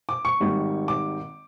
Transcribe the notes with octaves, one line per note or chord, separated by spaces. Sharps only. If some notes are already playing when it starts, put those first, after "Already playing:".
D6
C#6
G#1 G#2 D#3 G3
D6